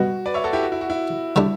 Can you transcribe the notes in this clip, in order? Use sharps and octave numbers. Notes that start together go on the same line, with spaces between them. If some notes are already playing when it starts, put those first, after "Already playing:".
Already playing: B2 G3 B3 F#4
B4 D5
C#5 E5
F#4 A4
E4 G4
F#4
E4
F#4
E4
D3 G3 D4